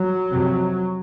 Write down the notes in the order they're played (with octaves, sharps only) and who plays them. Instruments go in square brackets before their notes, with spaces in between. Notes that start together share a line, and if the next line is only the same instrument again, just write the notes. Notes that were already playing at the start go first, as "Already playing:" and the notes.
Already playing: [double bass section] F#3
F2 C3